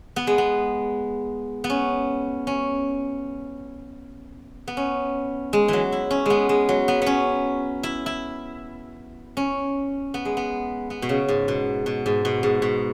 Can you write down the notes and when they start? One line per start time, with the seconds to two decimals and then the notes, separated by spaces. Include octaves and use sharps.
0.16 B3
0.27 G#3
0.38 B3
1.64 B3
1.70 C#4
2.47 C#4
4.68 B3
4.77 C#4
5.53 G#3
5.68 E3 F#3
5.92 E4
6.11 C#4
6.26 G#3 B3
6.49 G#3
6.69 F#3
6.88 B3
7.02 B3 C#4
7.83 E4
8.06 E4
9.37 C#4
10.14 B3
10.25 G#3
10.37 B3
10.90 B3
11.02 B2
11.09 C#3
11.28 G#2
11.48 B2
11.86 B2
12.06 G#2
12.25 B2
12.43 G#2
12.62 B2